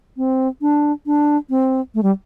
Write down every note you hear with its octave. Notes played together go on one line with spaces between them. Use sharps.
C4
D4
D4
C4
A3
G3